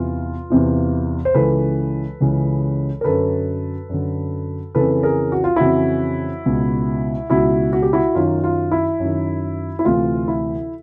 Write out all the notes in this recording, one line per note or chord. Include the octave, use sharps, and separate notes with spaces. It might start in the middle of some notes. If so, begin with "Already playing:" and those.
Already playing: E2 C3 E3 F4
E2 C3 E3
C5
C#2 C#3 E3 A4 B4
C#2 C#3 E3
A#4
F#2 D3 A4 B4
F#2 D3
F2 C#3 E3 A4 B4
G#4 A#4
F#4
F4
F2 C#3 E3 E4 F#4
C#2 B2
C#2 B2 E4 F#4
F#4
G4
E4 F#4
F#2 D#3 F4
F4
E4
F#2 D#3
E4
D2 C3 E3 F4
E4